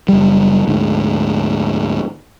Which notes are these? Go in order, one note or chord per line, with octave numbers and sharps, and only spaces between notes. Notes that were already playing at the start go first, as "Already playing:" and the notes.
F#1 G3
D2 G#2